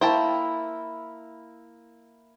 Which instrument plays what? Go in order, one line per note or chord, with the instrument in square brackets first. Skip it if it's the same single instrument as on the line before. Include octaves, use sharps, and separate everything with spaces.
[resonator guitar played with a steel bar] A#3 E4 [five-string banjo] C5 G5 A5